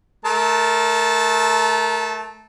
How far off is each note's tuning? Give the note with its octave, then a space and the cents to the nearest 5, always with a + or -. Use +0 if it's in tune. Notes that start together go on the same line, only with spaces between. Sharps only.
A3 -20 A#4 +0 A5 +0